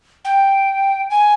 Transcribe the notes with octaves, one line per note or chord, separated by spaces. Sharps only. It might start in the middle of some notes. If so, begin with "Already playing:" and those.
G5
G#5